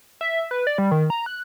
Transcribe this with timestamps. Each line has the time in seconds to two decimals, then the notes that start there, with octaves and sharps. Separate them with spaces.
0.21 E5
0.51 B4
0.67 D5
0.78 G3
0.91 D#3
1.10 A#5
1.26 F#6